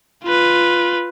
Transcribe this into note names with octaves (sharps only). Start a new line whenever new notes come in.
F4 B4